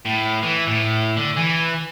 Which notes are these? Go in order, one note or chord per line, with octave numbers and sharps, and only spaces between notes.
A2
E3
A2
D3
E3